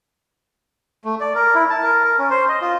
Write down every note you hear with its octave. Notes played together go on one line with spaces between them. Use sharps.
A3
D5
A#4
E4
A5
A#4
A#4
C#4
C5
D#5
F4